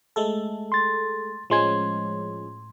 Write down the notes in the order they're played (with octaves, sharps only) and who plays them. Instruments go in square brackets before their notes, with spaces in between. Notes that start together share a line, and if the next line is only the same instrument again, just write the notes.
[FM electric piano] G#3 A3 A4
[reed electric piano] C6 A6
[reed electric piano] A2 C6 G#6 [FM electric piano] F3 G#3 C#4